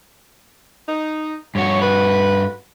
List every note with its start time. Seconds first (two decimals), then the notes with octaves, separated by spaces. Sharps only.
0.87 D#4
1.55 G2 F#4 C#5
1.81 B4